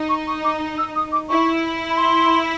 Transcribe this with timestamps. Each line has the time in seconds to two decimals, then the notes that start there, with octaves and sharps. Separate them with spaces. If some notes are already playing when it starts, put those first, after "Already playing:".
Already playing: D#4
0.09 C#6
0.27 C#6
0.44 D6
0.78 E6
0.96 D#6
1.12 D6
1.29 E4 C#6
1.90 B5
1.97 C6